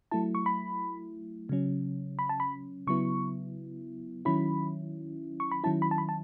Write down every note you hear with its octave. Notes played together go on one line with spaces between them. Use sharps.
F#3 A3 E4 A5
C#6
B5
C#3 F#3 C#4
B5
A5
B5
C#3 F#3 B3 E4 C#6
D#3 F#3 C#4 E4 B5
C#6
B5
D#3 F#3 C#4 E4 A5
B5
A5
B5
A5